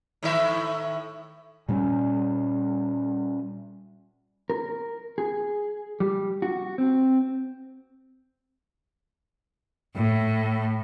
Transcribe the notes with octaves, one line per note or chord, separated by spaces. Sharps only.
A2 D#3 E5
A#2 G3 C4 C#4
A#4
G#4
G3
F#4
C4
A2